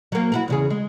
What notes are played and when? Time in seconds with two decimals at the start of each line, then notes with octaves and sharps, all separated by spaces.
0.12 F#3 A#3
0.32 E4 F#4 A#4
0.48 E2 C#3 G#4
0.70 G#3